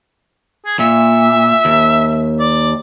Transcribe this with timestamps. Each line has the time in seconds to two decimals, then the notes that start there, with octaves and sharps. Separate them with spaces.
0.66 G#4
0.79 A#2 E5
1.65 D#2
2.40 D5